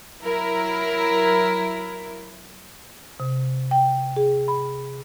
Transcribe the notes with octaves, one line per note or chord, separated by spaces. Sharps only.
F#3 E4 A#4
C3
G5
G#4
B5